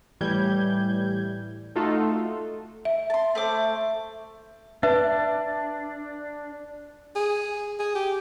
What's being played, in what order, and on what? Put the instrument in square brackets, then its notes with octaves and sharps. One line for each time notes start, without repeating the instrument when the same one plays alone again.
[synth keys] A2 E3 G3 G6 G#6
A3 D#4 F4 F#4 A4
[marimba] E5
[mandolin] A5 C6
A3 C5 D6
[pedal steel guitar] D4 [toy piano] B4 E5
[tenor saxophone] G#4
G#4
G4